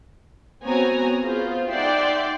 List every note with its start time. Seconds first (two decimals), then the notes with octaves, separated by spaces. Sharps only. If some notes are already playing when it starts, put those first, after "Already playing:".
0.64 B3 C4 F#4 C#5 G#5 A#5
1.22 B3 F4 G#4 C5
1.69 D#4 D5 E5 F#5 G5 C6